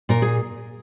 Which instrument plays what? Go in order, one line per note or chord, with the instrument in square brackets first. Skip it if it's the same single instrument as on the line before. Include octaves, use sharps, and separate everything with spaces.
[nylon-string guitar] A#2 A#4
G#4